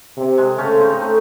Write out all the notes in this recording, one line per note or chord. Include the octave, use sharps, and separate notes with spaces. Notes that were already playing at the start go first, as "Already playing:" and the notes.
C3
G#3 C4
C#3 A3 C#4
C4 D#4
D#4
A3 C#4